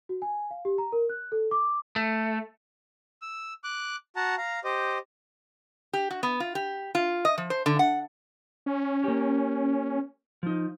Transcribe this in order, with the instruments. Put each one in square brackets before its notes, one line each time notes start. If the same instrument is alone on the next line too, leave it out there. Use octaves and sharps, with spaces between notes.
[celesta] F#4
G#5
F5
G4
A#5
A#4
F#6
A4
D6
[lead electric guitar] A3
[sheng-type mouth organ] E6
D6 F#6
F#4 F#5 A5 A#5
F5 A#5
G4 C5 D#5
[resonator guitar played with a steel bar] G4
F#4
B3
F4
G4
F4
D#5
F3
C5
D3
F#5
[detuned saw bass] C#4
[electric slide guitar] A#3 G4
F3 D#4